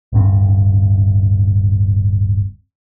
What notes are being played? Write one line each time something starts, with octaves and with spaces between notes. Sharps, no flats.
D1 G2 C4